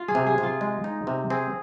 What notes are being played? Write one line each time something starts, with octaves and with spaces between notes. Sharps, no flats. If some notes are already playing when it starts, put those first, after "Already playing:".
Already playing: F4
G#4
C3
G#4
C3
F4
G#3
D#4
C3
C4 G#4